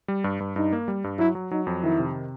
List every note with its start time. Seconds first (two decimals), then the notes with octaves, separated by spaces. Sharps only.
0.08 G3
0.24 G2
0.40 G2
0.56 G2 D#4
0.73 A#3
0.88 G3
1.04 G2
1.19 F#3 E4
1.35 F#3
1.51 F#3 D#4
1.67 F2
1.83 D#3 E4
1.99 C3